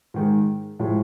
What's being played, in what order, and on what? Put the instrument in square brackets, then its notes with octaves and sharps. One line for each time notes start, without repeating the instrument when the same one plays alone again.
[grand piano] G#2 D#3 G#3
A2 F3 G#3